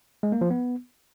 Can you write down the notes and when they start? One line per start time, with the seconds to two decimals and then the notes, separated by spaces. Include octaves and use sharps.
0.23 G#3
0.32 A#3
0.41 F3
0.50 B3